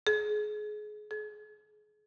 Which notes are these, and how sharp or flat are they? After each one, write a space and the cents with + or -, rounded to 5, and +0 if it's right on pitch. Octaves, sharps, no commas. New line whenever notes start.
G#4 +25
G#4 +30